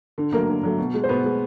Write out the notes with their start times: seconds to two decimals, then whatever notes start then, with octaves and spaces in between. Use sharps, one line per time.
0.18 D3
0.32 F#3 A3 A#3 A#4
0.48 D3
0.63 F#3 A3
0.78 B2
0.94 G#3
1.04 C5
1.09 B2 B3 B4
1.24 G#3